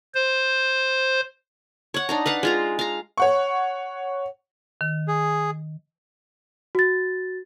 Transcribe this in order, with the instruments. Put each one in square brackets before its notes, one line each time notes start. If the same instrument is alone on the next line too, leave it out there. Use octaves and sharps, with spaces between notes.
[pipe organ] C5
[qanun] C#5 F#5
D4 D#4 A#5
B4 F5 F#5
G#3 F4 A#5
F5 A#5
[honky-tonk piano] C#5 F#5 C#6
[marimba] D#3
[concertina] G#4
[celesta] F#4 A6